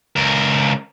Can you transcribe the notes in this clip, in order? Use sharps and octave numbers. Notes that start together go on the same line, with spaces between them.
C#2 A#4